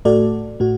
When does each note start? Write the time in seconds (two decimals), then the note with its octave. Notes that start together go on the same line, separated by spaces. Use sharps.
0.05 A2 A3 F#4 A4 D5
0.60 A2 A3 F#4